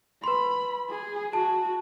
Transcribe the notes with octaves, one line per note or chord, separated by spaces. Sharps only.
B4 B5 C6
G#4
F#4 A5